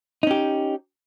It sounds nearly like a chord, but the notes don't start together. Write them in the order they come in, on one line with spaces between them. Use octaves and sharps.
D#4 C#4 G4